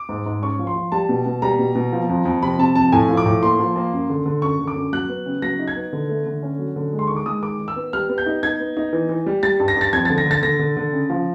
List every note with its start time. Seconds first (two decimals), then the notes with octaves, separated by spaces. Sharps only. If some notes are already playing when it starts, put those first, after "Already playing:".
Already playing: D6
0.09 G#2
0.26 G#2
0.42 C#4 C#6
0.59 F3
0.67 C6
0.76 F3
0.92 G3 A5
1.09 B2
1.26 B2
1.42 G3 A#5
1.59 B2
1.75 B2
1.93 F3
2.09 F2
2.25 F2
2.43 C3 B5
2.59 C3 A5
2.75 F2 A5
2.92 A2 G#5
3.09 F3
3.17 D6
3.26 A2
3.43 A#3 C6
3.59 F3
3.76 A#3
3.93 F#2
4.09 D3
4.26 D3
4.42 F#2 C#6
4.59 D3
4.68 D6
4.76 F#2
4.93 F#3 F#6
5.09 B3
5.26 C#3
5.42 F#3 A#6
5.59 D#4
5.68 G#6
5.76 B3
5.93 D3
6.09 A3
6.26 D3
6.43 C#4
6.59 F#3
6.76 D3
6.93 G#3
6.99 C6
7.07 D#3 C#6
7.16 D6
7.26 G#3 D#6
7.43 D#3 D6
7.60 D#3
7.68 E6
7.76 B3
7.93 G3 F6
8.09 B3
8.18 G6
8.26 D#4
8.43 D#4 G#6
8.60 B3
8.77 D#4
8.93 E3
9.09 E3
9.26 G3
9.43 G3 A6
9.60 G2
9.68 A#6
9.76 G2 A6
9.93 F2 G#6
10.05 D3 A6
10.18 A#6
10.26 D3 A6
10.42 D3 A#6
10.59 D3
10.77 D3
10.93 C#3
11.10 F3